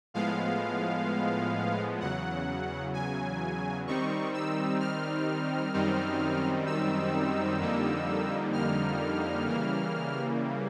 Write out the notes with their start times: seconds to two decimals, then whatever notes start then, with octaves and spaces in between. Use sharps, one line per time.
0.14 A2 F3 G#3 B3 F5
2.00 E2 C#3 F#3 F#5
2.94 G#5
3.87 D#3 G3 C4 D#4 C#6
4.34 E6
4.80 F6
5.73 F#2 D#3 G3 C4 D#4
6.66 E6
7.60 F2 D3 G3 A#3 D#4
8.53 F6
9.45 C#3 E3 G3 A#3